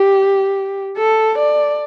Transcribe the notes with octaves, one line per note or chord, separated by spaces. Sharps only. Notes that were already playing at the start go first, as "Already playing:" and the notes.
Already playing: G4
A4
D5